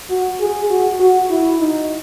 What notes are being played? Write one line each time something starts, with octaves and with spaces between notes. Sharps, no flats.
F#4
G#4
F#4
F#4
E4
D#4